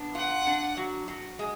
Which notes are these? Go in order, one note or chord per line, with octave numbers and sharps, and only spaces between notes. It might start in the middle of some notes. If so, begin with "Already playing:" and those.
Already playing: B3 D4
F4 F#5
D4
F#3
F#3
G#3